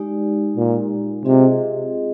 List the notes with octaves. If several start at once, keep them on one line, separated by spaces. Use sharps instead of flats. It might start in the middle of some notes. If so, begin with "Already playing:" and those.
Already playing: G#3 D#4 G4 D5
A#2
C3 C4 F4 G#4 D#5